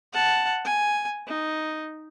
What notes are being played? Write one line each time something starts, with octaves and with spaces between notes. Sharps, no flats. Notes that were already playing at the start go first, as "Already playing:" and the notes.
F#5 A5
G#5
D#4